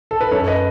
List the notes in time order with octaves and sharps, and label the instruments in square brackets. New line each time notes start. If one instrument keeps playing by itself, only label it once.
[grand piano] A4
B4
F#2 A4 C#5
B4 D#5